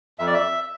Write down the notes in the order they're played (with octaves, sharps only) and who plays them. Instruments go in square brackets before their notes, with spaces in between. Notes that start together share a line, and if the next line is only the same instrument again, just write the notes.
[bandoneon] F2 E5
D5
E5